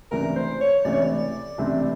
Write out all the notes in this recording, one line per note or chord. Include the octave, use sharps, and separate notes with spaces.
C#2 C3 E3 A3 D4 A#4
C5
C#5
C#2 C3 E3 A3 D4 D5
C#5
D5
C#2 C3 E3 A3 D4